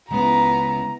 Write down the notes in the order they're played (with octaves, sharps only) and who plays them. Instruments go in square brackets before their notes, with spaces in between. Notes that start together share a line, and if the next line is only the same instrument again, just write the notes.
[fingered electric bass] C#3 G#3 [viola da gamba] B3 E4 [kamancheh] A#5